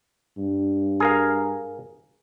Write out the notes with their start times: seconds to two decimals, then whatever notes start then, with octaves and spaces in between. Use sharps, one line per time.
0.38 G2
1.00 G#4 A#4 F5